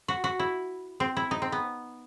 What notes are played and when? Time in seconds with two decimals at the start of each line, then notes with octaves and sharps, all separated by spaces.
0.08 F#4
0.24 F#4
0.39 E4
1.00 C4
1.17 E4
1.31 D#4
1.42 C4
1.52 B3